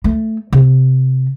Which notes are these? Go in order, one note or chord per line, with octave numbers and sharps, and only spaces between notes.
A3
C3